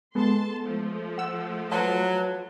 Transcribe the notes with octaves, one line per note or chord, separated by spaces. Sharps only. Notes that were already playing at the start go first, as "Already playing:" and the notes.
G#3 B3 A4 A5 C6
F3 A3
F#5 E6
F#3 F4 B4 A5